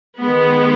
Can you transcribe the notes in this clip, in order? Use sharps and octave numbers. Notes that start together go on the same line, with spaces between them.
D#3 G#3 B3